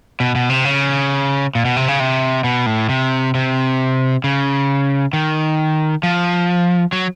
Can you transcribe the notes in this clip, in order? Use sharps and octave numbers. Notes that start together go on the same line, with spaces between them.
B2
B2
C3
C#3
A#2
B2
C3
C#3
C3
B2
A2
C3
C3
C#3
D#3
F3
F#3